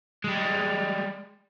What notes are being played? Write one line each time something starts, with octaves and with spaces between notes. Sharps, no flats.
G3 G#3